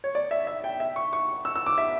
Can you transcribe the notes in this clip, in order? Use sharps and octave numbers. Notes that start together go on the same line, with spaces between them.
C#5
D5
E5
E5
G5
E5
C#6
C#6
E6
E6
D6
E5